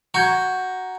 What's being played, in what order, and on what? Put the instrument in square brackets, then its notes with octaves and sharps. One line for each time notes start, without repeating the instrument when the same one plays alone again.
[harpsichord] F#4 [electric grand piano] A#5 G6 G#6